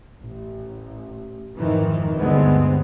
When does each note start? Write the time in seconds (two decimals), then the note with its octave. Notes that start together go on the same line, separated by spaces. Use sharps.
0.20 A1
1.55 F2 G#2 D#3 E3
2.19 D2 G2 D3 G#3 B3 C4